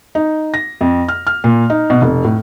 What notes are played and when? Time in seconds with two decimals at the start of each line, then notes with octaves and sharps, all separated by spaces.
0.15 D#4
0.54 A#6
0.81 F2
1.08 F6
1.27 F6
1.44 A#2
1.70 D#4
1.90 B2
2.02 F1
2.25 A2